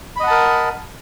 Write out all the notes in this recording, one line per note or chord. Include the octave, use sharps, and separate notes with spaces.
A#4 D#5 F#5 A5 B5